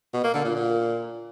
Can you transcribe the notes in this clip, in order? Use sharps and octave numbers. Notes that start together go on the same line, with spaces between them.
B2
A#3
D3
A#2
A#2